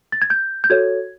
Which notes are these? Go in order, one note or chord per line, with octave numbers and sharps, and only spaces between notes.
A6
G#6
G6
G6
F#4 A4 C#5 G#6